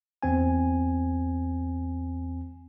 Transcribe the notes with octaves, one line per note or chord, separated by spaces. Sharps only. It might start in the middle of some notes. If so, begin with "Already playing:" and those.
E2 C4 G#5